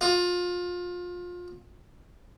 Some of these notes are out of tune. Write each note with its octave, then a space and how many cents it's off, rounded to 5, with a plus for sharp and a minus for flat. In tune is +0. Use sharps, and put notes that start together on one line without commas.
F4 +25